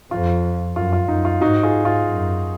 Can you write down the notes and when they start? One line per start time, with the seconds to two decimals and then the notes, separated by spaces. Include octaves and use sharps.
0.11 F2 F4
0.76 F#2 F4
0.93 F4
1.08 F#2 D#4
1.25 F4
1.41 G#2 D#4 F#4
1.63 F4 G#4
1.85 F4
2.07 F#2